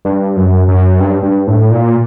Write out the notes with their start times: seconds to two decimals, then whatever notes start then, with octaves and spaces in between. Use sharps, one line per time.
0.05 G2
0.36 F#2
0.68 F#2
1.00 G2
1.23 G2
1.47 A2
1.71 A#2